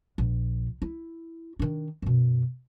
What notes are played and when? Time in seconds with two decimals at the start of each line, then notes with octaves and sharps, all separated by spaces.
0.18 A#1
0.82 E4
1.59 D#3 D4
2.02 F#2 B2